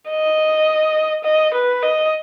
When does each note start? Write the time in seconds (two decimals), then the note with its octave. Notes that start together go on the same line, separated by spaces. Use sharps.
0.09 D#5
1.24 D#5
1.54 B4
1.83 D#5